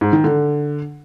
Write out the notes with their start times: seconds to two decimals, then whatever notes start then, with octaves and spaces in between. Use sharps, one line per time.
0.01 G#2
0.13 D#3
0.24 D3